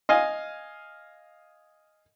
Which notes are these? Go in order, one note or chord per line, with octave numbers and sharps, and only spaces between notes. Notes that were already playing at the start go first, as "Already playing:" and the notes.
D#5 F5 G#5